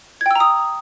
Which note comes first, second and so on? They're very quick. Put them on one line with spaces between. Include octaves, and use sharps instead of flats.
G#6 G5 E6 A#5 D#6